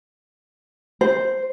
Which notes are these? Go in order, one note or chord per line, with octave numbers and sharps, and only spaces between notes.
C5